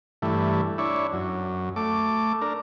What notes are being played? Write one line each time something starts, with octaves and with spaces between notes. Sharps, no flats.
G2 E3 A3
D4 E4 C#5
F#2
A3 D6
D4 A#4